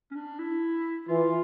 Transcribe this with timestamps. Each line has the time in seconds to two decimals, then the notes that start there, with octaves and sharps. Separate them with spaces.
0.12 C#4
0.16 D4
0.39 E4
1.08 E3 F4